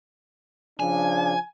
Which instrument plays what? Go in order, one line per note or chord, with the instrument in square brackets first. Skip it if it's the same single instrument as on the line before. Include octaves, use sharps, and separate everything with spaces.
[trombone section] C#3 F3 D4 [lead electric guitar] G#5